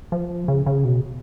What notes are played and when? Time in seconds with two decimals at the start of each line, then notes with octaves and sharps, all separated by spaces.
0.12 F3
0.48 C#3
0.66 C#3
0.85 B2